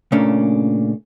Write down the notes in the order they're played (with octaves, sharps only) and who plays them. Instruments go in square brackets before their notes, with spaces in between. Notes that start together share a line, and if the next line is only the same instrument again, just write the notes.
[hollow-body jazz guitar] A#2 C#3 A3 A#3 C#4 D4